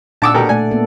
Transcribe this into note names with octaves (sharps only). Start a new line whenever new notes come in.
A#2 D4 F#5 A5 D6 E6
B2 G4 A4 A#4
A3 D5 G#5
A#3 B3 A4